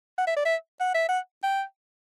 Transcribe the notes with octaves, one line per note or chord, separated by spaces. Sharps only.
F#5
E5
D5
E5
F#5
E5
F#5
G5